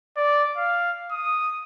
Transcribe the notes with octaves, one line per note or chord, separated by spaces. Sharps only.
D5
F5
D#6